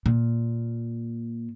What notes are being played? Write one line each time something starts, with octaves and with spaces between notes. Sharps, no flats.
A#2